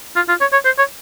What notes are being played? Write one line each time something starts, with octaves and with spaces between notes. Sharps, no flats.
F4
F4
C#5
C#5
C5
C#5